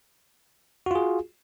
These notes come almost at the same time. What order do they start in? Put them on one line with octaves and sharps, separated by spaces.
F#4 F4 G#4